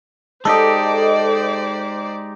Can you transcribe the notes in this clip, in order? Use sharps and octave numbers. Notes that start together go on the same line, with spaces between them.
G#3 D#4 G4 A4 C5 D5 D#5